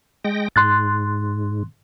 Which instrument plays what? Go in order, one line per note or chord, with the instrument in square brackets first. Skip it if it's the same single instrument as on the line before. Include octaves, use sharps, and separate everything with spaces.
[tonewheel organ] G#3 G5 A#6
[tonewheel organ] G#2 [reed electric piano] C6 F#6 A6